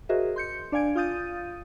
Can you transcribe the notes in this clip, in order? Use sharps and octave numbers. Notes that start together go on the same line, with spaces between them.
F#4 G#4 A#4 C5 D#5 E5
C6 G6 C#7
D4 D5 F5 G#5 G#6 D7
F4 F5 D#6 G6 A6 D#7